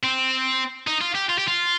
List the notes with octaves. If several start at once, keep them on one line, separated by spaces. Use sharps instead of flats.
C4
D#4
F4
G4
F4
G4
F4